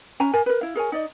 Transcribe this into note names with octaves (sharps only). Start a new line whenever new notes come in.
C#4 G#5 A#5
A#4 G#5
A#4 B4
E4 F5
G#4 A#4 C#5 G#5
D#4 D5 D#5